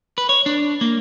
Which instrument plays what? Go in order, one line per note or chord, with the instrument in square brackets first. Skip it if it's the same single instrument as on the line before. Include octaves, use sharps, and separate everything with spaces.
[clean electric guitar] B4
C#5
D4
A#3